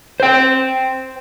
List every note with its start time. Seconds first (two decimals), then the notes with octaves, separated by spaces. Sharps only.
0.20 C5 G5